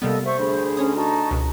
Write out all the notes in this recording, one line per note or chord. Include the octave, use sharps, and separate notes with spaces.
C3 G3 A#3 B3 A4 D#5
C5 E5 C#6
D2 G#4 B5
C#4 C#5 D#6
D#4 F#4 A5
C#2 B2